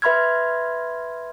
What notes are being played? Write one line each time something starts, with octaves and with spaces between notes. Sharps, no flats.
B4 E5 B5 C6 F6 G#6